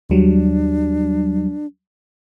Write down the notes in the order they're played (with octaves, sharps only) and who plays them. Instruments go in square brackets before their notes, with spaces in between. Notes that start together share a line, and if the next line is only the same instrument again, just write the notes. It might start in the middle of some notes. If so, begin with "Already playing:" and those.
[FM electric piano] D#2 F#3 G3 [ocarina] D4